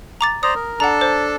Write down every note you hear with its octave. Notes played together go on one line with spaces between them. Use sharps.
A#5 D6 A6
C5 D5 A#5 D#6
A#4
D4 A4 F#5 A5 A#5
C5